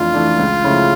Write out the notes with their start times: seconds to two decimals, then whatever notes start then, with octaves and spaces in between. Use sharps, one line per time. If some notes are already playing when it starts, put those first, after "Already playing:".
Already playing: F2 E3 A3 D4 F4
0.14 E3 A3 D4
0.39 C#2
0.64 C#3 F3 A3 E4